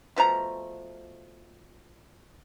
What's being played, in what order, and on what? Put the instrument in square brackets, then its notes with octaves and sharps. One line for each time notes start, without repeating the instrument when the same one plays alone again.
[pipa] B2 F3 A3 A#5